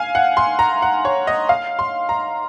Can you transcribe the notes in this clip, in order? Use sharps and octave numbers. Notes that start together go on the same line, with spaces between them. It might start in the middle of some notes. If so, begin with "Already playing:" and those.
Already playing: F5 G#5
F#5
C6
A#5
F#5
C#5
D#5
F5
C6
A#5